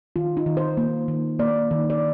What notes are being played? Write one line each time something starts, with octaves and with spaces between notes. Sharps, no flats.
D#3 F4
D#4
D#3
C5
A#3
D#3
A#3 D5
D#3
D5